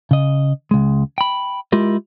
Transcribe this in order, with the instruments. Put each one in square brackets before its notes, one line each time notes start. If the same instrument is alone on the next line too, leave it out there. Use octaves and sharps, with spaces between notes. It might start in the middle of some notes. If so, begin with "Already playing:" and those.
[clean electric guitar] C#3 D#5
C#2 G#3
G5 B5
G#3 E4 F4 G4 A#4